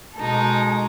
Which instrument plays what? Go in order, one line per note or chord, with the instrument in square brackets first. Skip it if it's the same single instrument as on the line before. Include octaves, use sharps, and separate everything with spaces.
[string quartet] B2 G#3 D#4 A4